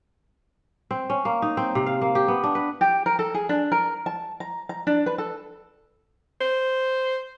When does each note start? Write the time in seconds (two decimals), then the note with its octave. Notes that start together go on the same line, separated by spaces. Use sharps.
0.91 C4
1.10 C#4
1.25 A#3
1.42 D#4
1.57 C4
1.75 C3
1.86 F5
2.01 A#3
2.15 G4
2.28 B3
2.44 D4
2.55 B4
2.81 G4
3.06 A#4
3.19 A4
3.34 G#4
3.49 D4
3.72 A#4
4.06 A5
4.40 A#5
4.69 A#5
4.87 D4
5.06 B4
5.18 A4
6.41 C5